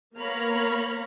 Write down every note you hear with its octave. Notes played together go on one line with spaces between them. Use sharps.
A#3 B3 C#5 F5 A#5 B5